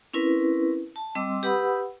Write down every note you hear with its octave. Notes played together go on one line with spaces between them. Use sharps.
C4 C#4 E4 A#4 B4
A5
G3 C4 D#5 C6 D6 E6
G4 B4 F#5 B5 D#6 E6